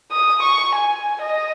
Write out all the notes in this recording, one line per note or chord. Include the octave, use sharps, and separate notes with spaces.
D#6
C#6
G#5
D#5